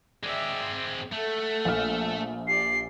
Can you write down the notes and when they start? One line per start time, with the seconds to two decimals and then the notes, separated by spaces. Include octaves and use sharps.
0.23 G#3 C4 D5 E5
1.13 A3 A4 F#5
1.65 A#1 F6
2.48 G4 D5 C7